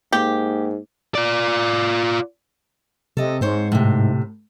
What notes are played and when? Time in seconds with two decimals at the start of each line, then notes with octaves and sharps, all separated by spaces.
0.12 G#2 A#3 G4
1.15 F4 D5
3.17 C3 A4 D#5
3.41 G#2 C4 C5 C#5
3.72 A2 C3